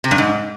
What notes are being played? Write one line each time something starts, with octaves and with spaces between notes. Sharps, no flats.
C3
G2
G#2